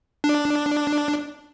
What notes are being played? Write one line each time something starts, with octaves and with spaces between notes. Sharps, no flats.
D4